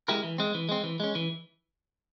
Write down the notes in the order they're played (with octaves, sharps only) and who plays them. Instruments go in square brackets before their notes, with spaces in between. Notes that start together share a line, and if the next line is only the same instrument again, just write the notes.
[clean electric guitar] G#3 E4 G4 A#4
E3
G#3 C4
E3
G#3 C4
E3
G#3 C#4
E3